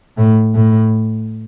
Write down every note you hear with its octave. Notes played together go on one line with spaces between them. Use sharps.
A2
A2